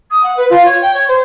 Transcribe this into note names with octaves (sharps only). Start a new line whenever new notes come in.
D#6
F#5
B4
F4
C#5
G5
C#5
C5